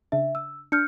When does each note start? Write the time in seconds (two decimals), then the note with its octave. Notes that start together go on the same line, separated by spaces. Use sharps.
0.12 C#3 D4 E5
0.35 E6
0.72 D4 F6 G6 C#7